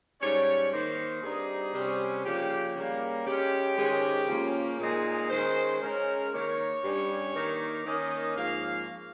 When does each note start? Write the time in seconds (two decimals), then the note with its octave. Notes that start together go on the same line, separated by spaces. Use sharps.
0.20 G#2 G3 C#4 C#5
0.71 D#3 A#3 D#4 C5
1.22 G2 G3 C4 D#4 G#4
1.73 C3 G3 C#4
2.24 C#3 F3 A#3 G4
2.76 C#3 G3 A#3
3.26 C#3 G#3 C#4 G4
3.78 G#2 D#3 G#3 C#4
4.28 C#3 F3 A#3 C#4
4.79 A#2 G#3 D#4 G#4
5.30 D#3 G#3 C#4 C5
5.81 C#3 G#3 C#4 A#4
6.33 D#3 A#3 D#4 C#5
6.83 G2 G3 C#4
7.35 D#3 A#3 D#4
7.85 D#3 A#3 C#4 D#5
8.36 G#2 F3 A#3 C#4 F5